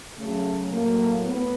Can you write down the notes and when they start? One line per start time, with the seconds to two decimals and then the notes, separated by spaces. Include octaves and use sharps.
0.17 C#3 F#3 A3
0.71 A2 F#3 A#3
1.26 A2 B3